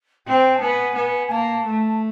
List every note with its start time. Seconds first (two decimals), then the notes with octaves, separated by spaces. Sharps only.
0.27 C4 G5
0.56 A5
0.61 B3 G#5
0.95 B3
1.27 G#5
1.31 A#3 A5
1.65 A3